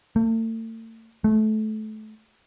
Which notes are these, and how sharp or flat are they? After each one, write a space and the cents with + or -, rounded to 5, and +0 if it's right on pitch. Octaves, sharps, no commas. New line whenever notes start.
A3 +40
A3 -25